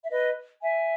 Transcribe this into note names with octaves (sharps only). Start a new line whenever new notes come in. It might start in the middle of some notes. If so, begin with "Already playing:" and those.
E5
B4 D#5
E5 G#5